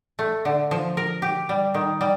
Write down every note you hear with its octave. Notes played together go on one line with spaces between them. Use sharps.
A3
D3
F3
A#4
G4
G3
D#3
G3